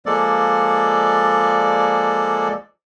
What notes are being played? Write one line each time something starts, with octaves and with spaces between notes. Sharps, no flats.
F3 G#3 A#3 A4 D5